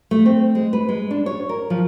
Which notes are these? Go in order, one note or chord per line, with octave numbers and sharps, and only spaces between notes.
A3
C4
G#3
B4
G#3
D4
C#5
A#4
F3